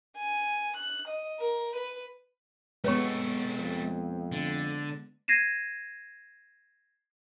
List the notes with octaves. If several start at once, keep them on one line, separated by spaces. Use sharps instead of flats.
G#5
F#6
D#5
A#4
B4
G#3 A3 B3 C4 B4 C#5 C#6
F2
D3
G#6 A#6 C7 D#7 E7